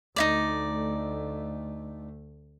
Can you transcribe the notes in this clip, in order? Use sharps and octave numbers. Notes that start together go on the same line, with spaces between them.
D2 A3 D#4 E4 D5